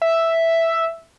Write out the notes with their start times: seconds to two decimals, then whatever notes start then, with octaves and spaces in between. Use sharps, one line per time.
0.02 E5